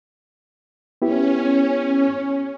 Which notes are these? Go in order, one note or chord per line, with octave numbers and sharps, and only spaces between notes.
B3 C#4 E4 G4